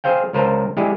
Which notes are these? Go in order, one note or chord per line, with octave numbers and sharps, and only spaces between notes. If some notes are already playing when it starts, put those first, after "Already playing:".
G#4 C5 F5 G5
C#2 A#4 C5 A5 A#5
G#3 E4 G4 G#4 D5